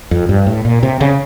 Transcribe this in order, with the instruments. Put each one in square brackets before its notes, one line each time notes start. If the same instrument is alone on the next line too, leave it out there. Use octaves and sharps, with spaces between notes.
[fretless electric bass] F2
G2
A2
A#2
C3
C#3